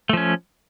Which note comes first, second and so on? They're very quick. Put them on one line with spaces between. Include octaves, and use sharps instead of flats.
A3 F3 C#4